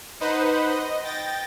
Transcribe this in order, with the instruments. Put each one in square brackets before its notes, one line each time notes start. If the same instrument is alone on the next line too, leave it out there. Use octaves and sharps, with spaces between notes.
[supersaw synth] D#4 B4 C5 D#5 F#5 B5
D#5
G5 A6 A#6